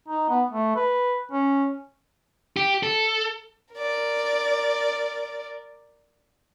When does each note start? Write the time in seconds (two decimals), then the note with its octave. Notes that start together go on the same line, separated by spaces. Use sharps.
0.08 D#4
0.30 B3
0.50 A3
0.76 B4
1.32 C#4
2.57 G4
2.83 A4
3.74 A#4 D5